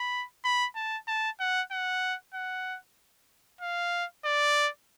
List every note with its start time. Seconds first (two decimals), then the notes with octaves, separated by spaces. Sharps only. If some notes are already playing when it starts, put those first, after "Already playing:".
Already playing: B5
0.45 B5
0.75 A5
1.08 A5
1.40 F#5
1.71 F#5
2.34 F#5
3.61 F5
4.25 D5